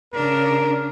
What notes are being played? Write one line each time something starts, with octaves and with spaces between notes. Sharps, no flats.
C#3 D4 A#4